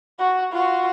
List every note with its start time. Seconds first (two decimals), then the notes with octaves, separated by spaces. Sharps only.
0.19 F#4
0.52 F4 F#4